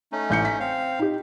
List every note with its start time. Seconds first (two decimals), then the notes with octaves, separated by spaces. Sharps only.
0.12 A3 C#4 D#4
0.30 A1 G6 C#7
0.45 B6
0.60 C4 F5
0.99 D#4 G4